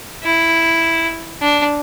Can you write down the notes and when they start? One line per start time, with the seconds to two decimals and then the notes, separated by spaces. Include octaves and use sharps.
0.23 E4
1.42 D4